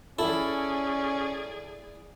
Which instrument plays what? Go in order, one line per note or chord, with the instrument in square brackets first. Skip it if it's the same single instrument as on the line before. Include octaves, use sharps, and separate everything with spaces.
[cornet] C#4 [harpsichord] E4 [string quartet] G#4 D5 [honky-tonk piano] A4